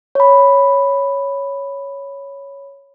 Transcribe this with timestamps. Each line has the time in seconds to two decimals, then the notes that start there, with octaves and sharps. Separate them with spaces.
0.15 C#5 B5